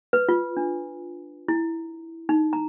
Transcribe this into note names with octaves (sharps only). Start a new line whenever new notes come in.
B4
F4
D4
E4
D#4
A#5